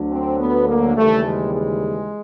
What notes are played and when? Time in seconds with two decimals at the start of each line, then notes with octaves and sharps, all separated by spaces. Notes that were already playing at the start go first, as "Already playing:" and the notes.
Already playing: D2 D3 F#3
0.11 C4
0.39 B3
0.68 A#3
0.96 D#2 C#3 E3 G3 A3
1.25 G#3
1.53 G#3